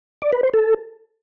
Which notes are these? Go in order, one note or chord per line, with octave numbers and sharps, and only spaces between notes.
D5
B4
C5
A4